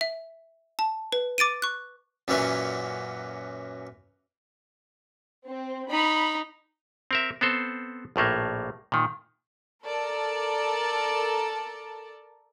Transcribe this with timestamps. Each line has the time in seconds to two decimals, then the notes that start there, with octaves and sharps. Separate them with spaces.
0.01 E5
0.79 A5
1.12 B4
1.38 D6 A6 D7 D#7
1.62 C#6 F#6
2.28 F#2 A#2 E3 F#3 C#4
5.46 C4
5.90 D#4 B5
7.11 C4 A#4 E5
7.41 B3 C4 A4 C5
8.16 A#1 A2 A3 A#3
8.92 A#2 D#3
9.84 A4 A#4 D5 A5 A#5